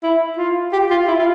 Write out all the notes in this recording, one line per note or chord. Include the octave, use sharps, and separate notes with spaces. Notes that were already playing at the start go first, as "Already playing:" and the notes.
E4
F4
G4
F4
E4
F4